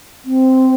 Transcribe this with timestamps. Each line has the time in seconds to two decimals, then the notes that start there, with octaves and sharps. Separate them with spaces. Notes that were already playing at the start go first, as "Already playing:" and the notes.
0.25 C4